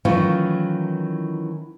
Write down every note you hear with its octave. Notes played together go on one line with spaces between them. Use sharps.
D#3 E3 F#3 A3 C#4 F4